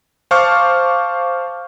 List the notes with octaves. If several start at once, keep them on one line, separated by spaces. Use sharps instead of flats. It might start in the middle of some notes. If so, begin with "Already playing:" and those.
C5 F5 A5 C#6 D6 F6